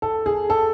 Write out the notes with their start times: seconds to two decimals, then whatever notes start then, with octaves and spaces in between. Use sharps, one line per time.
0.02 A4
0.26 G#4
0.50 A4